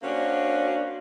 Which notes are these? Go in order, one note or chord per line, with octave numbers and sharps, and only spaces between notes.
A#3 C#4 D4 F#4 C5